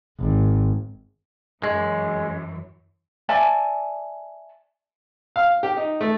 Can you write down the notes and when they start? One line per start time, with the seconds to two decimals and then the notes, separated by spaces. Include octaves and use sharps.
0.20 G#1
1.64 F#2 E3 G#3
3.29 D5 E5 G#5 A5
5.36 F5
5.63 G4
5.77 D#4
6.01 A3